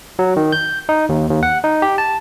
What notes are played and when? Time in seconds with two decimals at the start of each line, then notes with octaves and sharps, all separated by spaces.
0.19 F#3
0.36 D#3
0.52 G6
0.89 D#4
1.09 D#2
1.30 D#2
1.43 F#5
1.64 D#4
1.82 G4
1.98 A5